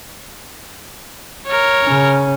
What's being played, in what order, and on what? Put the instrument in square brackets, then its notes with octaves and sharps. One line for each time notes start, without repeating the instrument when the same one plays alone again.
[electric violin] A#4 C#5
[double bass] C#3 C#4